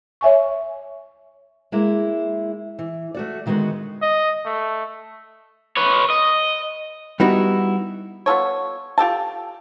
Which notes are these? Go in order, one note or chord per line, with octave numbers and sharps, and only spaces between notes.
C#5 E5 G#5 C#6
G#3 A#3 E4
E3
A3 F#4 D5
D3 D#3 G#3 B3 F#4
D#5
A3
B4 C#5
D#5
G3 B3 D#4 E4 F#4
B3 F4 A4 C#5
F4 G4 A4 A5